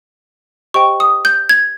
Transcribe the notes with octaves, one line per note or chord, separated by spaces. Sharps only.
G4 C5 D#5 G5 C#6
D#6
G6
G#6